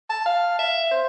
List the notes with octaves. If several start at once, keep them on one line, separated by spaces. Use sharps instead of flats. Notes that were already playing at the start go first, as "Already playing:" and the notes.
A5
F5
E5
C5